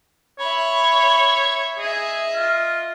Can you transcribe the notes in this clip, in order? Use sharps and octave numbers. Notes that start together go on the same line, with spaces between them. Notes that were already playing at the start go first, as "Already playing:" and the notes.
C#5 E5 B5
G#4 D#5 E5
F4